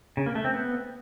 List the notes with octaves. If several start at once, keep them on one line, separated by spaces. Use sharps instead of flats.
C#3
A#3
A3
C4
B3